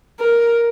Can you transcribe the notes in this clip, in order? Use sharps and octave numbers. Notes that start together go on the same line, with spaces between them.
A#4